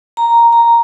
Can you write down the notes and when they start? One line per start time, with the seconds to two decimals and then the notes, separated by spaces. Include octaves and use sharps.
0.17 A#5
0.53 A#5